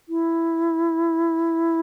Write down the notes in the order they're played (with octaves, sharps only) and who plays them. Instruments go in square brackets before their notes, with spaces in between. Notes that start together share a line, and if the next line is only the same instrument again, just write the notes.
[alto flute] E4